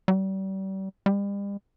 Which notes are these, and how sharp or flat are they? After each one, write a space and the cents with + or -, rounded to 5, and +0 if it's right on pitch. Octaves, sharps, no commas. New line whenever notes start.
G3 -35
G3 +40